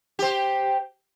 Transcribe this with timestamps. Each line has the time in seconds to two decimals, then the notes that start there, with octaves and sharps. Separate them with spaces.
0.19 G4 C5